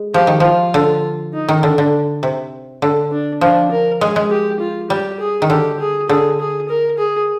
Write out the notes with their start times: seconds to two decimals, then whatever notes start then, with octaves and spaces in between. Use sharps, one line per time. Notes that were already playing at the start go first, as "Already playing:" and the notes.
Already playing: G#3
0.14 F3 G4
0.27 D#3
0.40 F3 F4
0.74 D3
1.33 D#4
1.48 D#3
1.63 D3 D4
1.78 D3
2.23 C3
2.82 D3
3.11 D4
3.41 F3 D4
3.71 A#4
4.01 G#3 G#4
4.16 G#3
4.31 G4
4.60 F4
4.90 G3 G4
5.20 G#4
5.42 D#3
5.50 D3 G4
5.80 G#4
6.09 D3 G#4
6.39 G#4
6.69 A#4
6.98 G#4